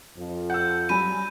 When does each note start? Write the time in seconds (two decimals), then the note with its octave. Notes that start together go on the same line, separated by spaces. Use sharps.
0.18 F2 F3
0.50 F#5 E6 G6
0.89 G2 F#3 G#5 B5 D#7